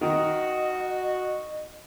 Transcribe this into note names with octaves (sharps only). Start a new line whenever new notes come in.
D#3 F#4 D#5